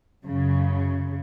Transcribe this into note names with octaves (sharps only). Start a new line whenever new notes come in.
F#2 C#3